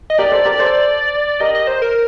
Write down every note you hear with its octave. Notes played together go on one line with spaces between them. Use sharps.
D#5
G4 A#4 D5
A4 C5
G4 A#4
A4 C5
G4 A#4 D#5
D#5
C5
A#4